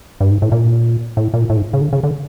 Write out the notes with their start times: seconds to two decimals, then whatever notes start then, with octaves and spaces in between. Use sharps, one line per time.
0.21 G2
0.31 G#2
0.42 A2
0.52 A#2
1.17 A2
1.34 A#2
1.50 A2
1.57 G#2
1.73 C#3
1.81 D3
1.93 C#3
2.03 D3